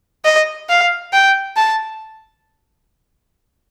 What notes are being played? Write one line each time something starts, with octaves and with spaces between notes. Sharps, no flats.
D#5
F5
G5
A5